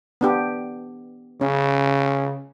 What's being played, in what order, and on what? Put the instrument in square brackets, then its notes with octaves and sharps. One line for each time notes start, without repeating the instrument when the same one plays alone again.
[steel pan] B3 D4 G4
[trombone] C#3 [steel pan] C#4